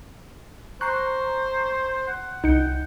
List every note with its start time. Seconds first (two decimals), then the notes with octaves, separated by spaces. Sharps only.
0.81 C5 A#5 C#6 F#6 C7
2.07 F#5
2.44 C2 D#4 G6 C#7